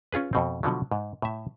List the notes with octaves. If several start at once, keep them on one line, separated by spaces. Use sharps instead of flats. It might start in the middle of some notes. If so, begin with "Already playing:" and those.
C#4 F4 G#4 B4
F2 B2 C4
B2 D3 F3 F#3
G#2
A2 E5